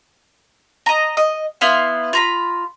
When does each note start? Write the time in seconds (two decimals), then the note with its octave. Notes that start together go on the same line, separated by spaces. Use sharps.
0.86 D#5 A#5
1.17 D#5
1.61 B3 E4 F5 C6
2.13 F4 A#5 B5